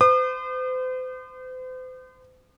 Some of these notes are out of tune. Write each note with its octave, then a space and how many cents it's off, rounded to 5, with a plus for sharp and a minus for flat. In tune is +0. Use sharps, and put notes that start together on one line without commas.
C5 -40 D#6 -45